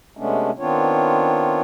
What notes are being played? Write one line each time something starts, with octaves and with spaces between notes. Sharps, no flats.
C3 G#3 A3 B3 C#4 D4
D#3 B3 C4 D4 F4 C#5